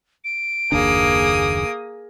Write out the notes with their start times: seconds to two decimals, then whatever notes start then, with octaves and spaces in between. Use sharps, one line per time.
0.24 D7
0.72 F#1 D#2 A#3 D4 G#4 D#6